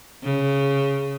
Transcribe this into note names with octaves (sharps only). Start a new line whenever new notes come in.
C#3